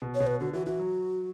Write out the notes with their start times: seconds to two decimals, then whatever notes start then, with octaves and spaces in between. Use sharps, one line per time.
0.02 B2
0.15 C#5
0.20 B2
0.27 B4
0.40 D3 F#4
0.53 E3 F#4
0.66 E3 F#4
0.79 F#3